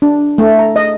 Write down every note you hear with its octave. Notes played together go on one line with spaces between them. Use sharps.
D4
A3
A#5
D#5